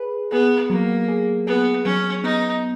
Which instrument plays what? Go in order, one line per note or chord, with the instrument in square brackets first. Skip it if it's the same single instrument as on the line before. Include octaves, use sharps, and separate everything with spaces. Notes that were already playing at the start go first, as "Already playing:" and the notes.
Already playing: [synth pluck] G#4 B4
[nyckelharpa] B3 [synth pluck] G#4
[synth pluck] F#3 [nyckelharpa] A#3
[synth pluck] G#4
[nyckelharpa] B3 [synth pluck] G#4
[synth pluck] F#3 [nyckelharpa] C#4
[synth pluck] B3 [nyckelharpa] D#4